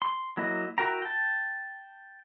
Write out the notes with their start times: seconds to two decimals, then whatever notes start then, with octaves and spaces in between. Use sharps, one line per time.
0.02 C6
0.37 F#3 A#3 E4 D#5
0.78 E4 F#4 A#4 G5 A#5
1.02 G5 A5